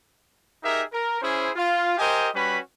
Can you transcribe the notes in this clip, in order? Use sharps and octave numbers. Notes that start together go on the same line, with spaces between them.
D#4 G4 G#4 A#4 E5
A#4
C#4 E4 G#4 C5
F4
G4 A#4 C5 D#5 G#5
G3 C#4 F#4 B4 B5